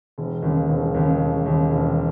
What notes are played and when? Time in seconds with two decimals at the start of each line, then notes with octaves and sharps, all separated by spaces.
0.18 E1
0.42 D#2 C#3
0.68 E1
0.94 D#2 C#3
1.20 E1
1.46 D#2 C#3
1.71 E1